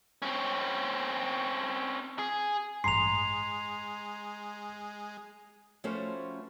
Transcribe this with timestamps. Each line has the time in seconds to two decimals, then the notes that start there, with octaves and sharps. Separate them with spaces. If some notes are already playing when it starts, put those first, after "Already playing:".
0.22 C4 C#4
2.19 G#4
2.84 A1 G2 G#3 A#5 C6 C7 F7
5.84 F3 A3 C#4 F#4 B4 C5